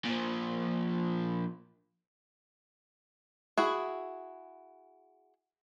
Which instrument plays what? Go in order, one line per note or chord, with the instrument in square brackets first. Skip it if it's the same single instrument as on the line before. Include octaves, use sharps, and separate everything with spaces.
[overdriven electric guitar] A#2 F3
[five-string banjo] E4 F#4 G#4